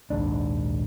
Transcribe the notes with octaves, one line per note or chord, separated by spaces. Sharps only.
A#1 D#2 G#2 D4